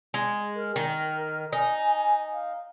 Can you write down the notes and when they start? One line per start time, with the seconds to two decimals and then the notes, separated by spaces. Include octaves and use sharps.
0.14 G#3
0.56 A#4
0.76 D#3 A#4
1.53 D#4 G#5
2.32 F5